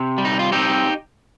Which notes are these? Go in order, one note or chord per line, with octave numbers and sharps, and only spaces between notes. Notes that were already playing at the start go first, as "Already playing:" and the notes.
Already playing: C3
G3
D#4
F4
C4 D#4 G4